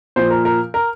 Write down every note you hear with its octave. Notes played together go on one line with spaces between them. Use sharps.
A#2 F3 C5
A#4
A#4
A#4